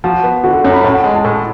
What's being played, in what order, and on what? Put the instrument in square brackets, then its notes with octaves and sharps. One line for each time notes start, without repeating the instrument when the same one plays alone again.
[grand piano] F3 [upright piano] F#4
[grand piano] B3
[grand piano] D3 [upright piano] F#4
[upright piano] A4
[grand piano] F#2 [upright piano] C#5
[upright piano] B5
[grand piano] A2 [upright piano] A5
[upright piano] F#5
[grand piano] G#3 [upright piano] G#5
[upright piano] A5
[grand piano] A2 [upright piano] B5